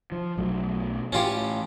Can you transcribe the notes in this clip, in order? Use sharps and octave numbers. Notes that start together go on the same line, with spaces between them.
F3
B1 F#3 A3
A2 E3 C#4 F4 G4